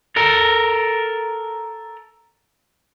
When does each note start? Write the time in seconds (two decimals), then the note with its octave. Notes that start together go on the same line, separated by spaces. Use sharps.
0.16 A4 A#4